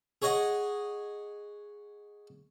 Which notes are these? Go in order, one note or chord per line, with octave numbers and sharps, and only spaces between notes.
G#4 C#5 D#5 F#5 D#6